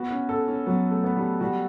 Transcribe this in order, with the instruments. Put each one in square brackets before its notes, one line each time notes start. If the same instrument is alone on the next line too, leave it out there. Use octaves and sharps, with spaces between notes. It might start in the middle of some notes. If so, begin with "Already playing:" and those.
Already playing: [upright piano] B3 [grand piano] F#4
[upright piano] C#4
[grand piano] A4
[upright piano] C#4
[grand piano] F#3 [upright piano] B3
[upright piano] A3
[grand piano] B3
[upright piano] G3
[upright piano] G3 [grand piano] F#4